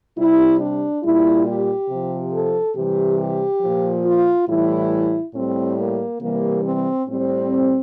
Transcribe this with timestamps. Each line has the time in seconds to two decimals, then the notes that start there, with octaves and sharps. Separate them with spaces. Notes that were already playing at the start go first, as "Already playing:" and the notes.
0.17 C3 G3 E4
0.60 D4
1.03 A#2 G3 E4
1.46 G4
1.89 C3 F3
2.32 A4
2.75 C3 E3 G3 G4
3.18 G4
3.61 A#2 F3
4.05 F4
4.48 A2 E3 G3 E4
5.34 A2 G3 C4
5.78 A#3
6.21 C3 E3 G3 A#3
6.64 C4
7.07 A2 G3 C4